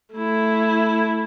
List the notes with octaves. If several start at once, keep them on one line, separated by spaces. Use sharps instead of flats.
A3 E4